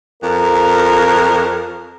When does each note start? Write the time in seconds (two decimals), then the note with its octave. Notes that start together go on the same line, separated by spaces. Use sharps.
0.23 F2 A#4